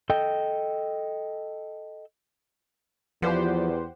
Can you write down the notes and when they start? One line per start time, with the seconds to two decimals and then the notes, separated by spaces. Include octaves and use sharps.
0.10 A4 D#5 G5
3.22 E2 F3 G4 B4 C5 D5 F#5